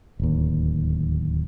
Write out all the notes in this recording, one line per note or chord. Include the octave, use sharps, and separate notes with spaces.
D1 D#2